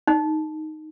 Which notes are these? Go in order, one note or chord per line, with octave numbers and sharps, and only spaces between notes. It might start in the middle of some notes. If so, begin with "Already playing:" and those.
D#4